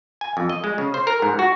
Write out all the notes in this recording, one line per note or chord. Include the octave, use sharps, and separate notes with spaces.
G#5
F2
D#5
G#3
C#3
C5
A#4
G#2
F#4